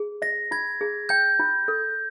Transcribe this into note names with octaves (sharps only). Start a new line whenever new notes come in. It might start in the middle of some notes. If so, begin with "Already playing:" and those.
Already playing: G#4
D#5 A#6
F4 G#6
G#4
G5 G6
F4
A4